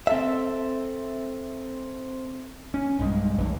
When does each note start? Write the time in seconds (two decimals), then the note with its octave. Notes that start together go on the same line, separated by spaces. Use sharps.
0.07 C4 A4 E5
2.74 C#4
2.99 B1 G2 G#3
3.38 F1 B1 E3